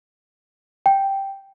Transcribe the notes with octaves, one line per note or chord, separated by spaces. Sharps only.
G5